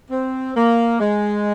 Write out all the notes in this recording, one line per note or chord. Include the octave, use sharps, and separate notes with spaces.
C4
A#3
G#3